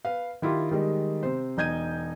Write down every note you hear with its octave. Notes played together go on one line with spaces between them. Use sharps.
B4 F5
D#3 E4 F4 G4
D#3 G3 G#3
C3 C5
E1 D#4 G6 G#6 D#7